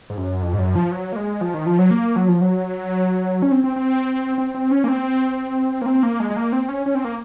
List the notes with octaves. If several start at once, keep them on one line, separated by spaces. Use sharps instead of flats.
G#2
F#2
F2
G#2
F#2
F3
F#3
A#3
G#3
F3
D#3
F3
F#3
A#3
F#3
F3
F#3
C#4
C4
C4
C4
C4
C4
C#4
A#3
C4
A#3
C4
A#3
G#3
G#3
A#3
C4
C#4
C#4
C4
A#3